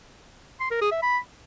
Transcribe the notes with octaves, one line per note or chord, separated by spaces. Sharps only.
C6
A#4
G#4
E5
B5